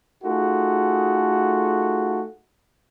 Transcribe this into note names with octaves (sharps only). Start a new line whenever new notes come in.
A3 D#4 F4 F#4 G#4 A4